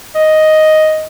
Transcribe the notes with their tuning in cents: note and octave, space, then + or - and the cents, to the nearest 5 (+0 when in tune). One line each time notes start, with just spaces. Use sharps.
D#5 +5